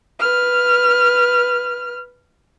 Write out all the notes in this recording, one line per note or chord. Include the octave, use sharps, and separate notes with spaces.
B4 F6